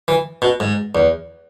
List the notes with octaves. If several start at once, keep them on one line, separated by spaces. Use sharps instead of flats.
E3
B2
G#2
E2